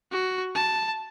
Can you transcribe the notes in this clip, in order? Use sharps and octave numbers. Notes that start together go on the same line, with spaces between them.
F#4
A5